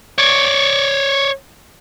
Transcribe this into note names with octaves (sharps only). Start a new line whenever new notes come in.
C#5 D5